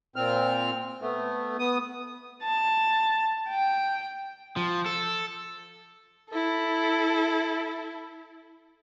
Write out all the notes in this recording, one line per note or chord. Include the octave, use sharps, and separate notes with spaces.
A#2 C4 F6
A3 B3
B3 D#6
A5
G5
F3
A4
E4 A4